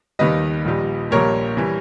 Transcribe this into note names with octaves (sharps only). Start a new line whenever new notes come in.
D#2 D#3 G3 B4 D#5
A#1 A#2 G3
A#1 A#2 G3 A#4 C#5
E3 G3